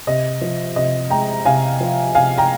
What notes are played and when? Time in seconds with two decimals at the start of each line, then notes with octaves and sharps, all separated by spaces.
0.07 C3 D#5
0.41 F3
0.76 C3 D#5
1.10 G#3 G5 A#5
1.45 C3 F5 G#5
1.81 F3
2.15 C3 F5 G#5
2.38 G5 A#5